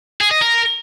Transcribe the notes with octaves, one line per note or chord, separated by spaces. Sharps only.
G#4
D#5
A#4